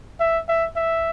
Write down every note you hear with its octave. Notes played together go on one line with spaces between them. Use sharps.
E5
E5
E5